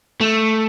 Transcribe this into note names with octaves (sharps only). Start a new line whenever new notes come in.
A3